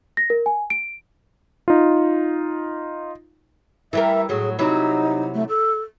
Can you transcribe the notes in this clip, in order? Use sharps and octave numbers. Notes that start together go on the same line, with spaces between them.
A#6
A#4
G#5
D7
D#4 F4
E3 G3 A#4 E5
A2 F#3 G#4
C3 F#3 D#4 E4
A3
A4